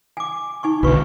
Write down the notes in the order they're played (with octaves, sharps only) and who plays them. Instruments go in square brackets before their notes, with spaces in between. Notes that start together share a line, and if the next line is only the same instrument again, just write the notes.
[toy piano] G#5 D6
D#4 G#5 C#6
[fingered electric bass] B1 D3 [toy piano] F#4 B4 C#6